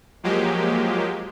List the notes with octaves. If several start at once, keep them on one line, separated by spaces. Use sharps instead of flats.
F3 F#3 G#3 A#3 G4